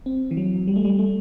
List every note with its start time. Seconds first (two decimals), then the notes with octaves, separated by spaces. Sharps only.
0.06 C4
0.31 E3
0.37 F#3
0.68 G3
0.76 A3
0.85 G3
0.99 A3